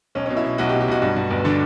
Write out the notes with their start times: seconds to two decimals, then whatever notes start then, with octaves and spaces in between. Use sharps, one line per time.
0.15 B1 C#4
0.26 C#4
0.30 B2
0.37 E4
0.44 B2
0.58 B1 F#4
0.69 G4
0.73 B2
0.81 G4
0.88 B1 F#4
1.02 G2
1.16 G2
1.31 G1
1.45 D3 D4